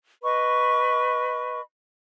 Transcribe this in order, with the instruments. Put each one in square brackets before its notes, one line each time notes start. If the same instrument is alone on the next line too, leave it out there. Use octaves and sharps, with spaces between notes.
[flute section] B4 D#5 B5 C#6